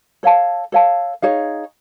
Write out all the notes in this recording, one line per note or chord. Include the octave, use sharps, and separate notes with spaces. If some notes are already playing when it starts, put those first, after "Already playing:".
A4 C#5 F5 A5
A4 C#5 F5 A5
D#4 G#4 C#5 F5